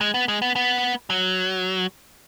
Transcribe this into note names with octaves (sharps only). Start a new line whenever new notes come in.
G#3
B3
G#3
B3
B3
F#3